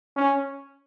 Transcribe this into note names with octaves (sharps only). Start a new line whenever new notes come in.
C#4